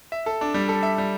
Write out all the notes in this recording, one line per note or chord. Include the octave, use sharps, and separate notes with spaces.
E5
A4
D4
G3
A4
E5
G3